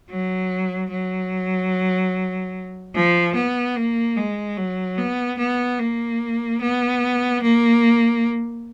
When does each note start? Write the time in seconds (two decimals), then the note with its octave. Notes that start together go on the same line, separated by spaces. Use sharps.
0.10 F#3
0.91 F#3
2.95 F3
3.36 B3
3.76 A#3
4.17 G#3
4.57 F#3
4.99 B3
5.38 B3
5.80 A#3
6.61 B3
7.43 A#3